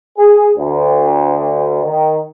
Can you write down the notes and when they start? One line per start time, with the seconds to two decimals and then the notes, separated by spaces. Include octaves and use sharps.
0.18 G#4
0.58 D2
1.84 D#3